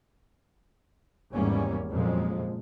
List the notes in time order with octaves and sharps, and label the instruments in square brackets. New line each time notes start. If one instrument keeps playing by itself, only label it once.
[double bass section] G#1 E2 G#2 G3 A#3 C#4
F2 A#2 C#3 F3 F#3 G#3